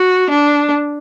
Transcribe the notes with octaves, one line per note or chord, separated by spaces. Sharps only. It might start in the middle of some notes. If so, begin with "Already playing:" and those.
Already playing: F#4
D4